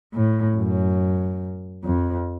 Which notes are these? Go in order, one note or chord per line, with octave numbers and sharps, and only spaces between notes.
A2
F#2
F2